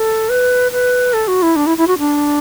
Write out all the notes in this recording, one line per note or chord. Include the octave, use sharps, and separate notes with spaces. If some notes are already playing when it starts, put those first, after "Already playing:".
Already playing: A4
B4
B4
A4
F#4
E4
D4
E4
E4
F#4
D4